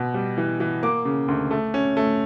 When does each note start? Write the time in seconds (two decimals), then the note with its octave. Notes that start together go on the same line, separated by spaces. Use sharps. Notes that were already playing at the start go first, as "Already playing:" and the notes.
Already playing: B2
0.14 G3
0.38 E3
0.60 E3
0.83 A#3 D6
1.05 C#3
1.28 D2
1.51 A3
1.74 C#4
1.97 A3